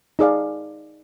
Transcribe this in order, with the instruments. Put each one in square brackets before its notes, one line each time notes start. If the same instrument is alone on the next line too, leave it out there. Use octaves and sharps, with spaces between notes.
[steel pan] D#4 G#4 D5 F5